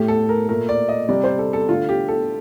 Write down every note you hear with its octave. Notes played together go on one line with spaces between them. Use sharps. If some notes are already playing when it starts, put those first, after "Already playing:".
Already playing: A2 A3 G4
A4
A#4
A#2 A3 A#4
D5
D#5
C3 G3 D5
C5
A4
A4
D3 A3 F4
G4
A4